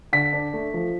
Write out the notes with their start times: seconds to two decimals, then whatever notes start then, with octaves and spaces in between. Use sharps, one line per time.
0.13 D3 B6
0.33 D4
0.54 A3
0.74 F3